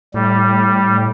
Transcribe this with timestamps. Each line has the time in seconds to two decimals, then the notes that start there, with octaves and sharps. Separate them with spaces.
0.14 A2 G3